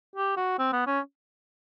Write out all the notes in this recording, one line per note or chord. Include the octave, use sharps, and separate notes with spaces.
G4
F#4
C4
B3
C#4